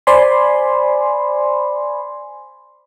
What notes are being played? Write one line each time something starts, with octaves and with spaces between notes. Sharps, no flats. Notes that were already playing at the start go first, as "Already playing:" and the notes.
C5 D5 G#5 B5 C6